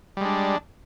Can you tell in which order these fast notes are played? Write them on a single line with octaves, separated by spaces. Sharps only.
G3 G#3 D4